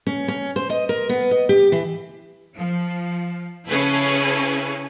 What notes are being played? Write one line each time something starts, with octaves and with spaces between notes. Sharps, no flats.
C#4
C#4
C5
D#5
A#4
B3
D#5
G4
E3
F3
C#3 C#4 E4 G#4 A4 B4